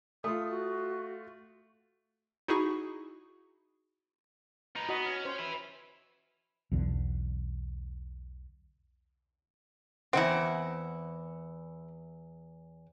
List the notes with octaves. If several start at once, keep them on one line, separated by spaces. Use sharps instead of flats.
A3 F4 D#6
F#4
D#4 E4 F#4 G#4 C#6
B3 D#4
B3 F#4 D#5
C#4
C5
B4 E5
B1 E2 D3
E2 D#3 C4 E4 F#5